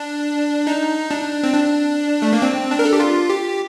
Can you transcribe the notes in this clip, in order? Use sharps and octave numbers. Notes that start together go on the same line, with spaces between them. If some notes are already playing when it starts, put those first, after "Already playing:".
Already playing: D4
D#4
D4
C4
D4
A3
A#3
C4
D4
A#4
A4
G4
F4
G4